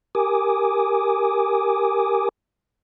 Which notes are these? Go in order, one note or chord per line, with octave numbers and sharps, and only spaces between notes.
G4 A#4 G#5 D6 D#6